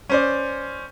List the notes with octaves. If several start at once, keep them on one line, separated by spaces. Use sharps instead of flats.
C#4 C5 D5